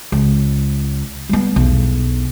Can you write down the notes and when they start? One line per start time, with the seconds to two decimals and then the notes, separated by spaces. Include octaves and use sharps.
0.12 C#2
1.29 G3 B3
1.56 B1 E2